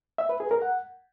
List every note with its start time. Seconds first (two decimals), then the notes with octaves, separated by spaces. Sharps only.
0.18 E5
0.29 B4
0.40 G#4
0.51 A#4
0.62 F#5